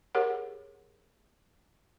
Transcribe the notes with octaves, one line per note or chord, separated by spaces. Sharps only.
G4 G#4 A#4 C#5 F#5